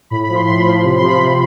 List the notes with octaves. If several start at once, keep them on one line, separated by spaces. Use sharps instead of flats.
A2 B5
B5
F3
C6
A2 C6
B5
F3
C6
C3 B5
C6
F3
B5
C3